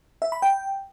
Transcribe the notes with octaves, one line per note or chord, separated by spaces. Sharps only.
E5
B5
G5